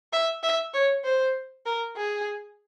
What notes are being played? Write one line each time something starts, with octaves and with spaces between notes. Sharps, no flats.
E5
E5
C#5
C5
A#4
G#4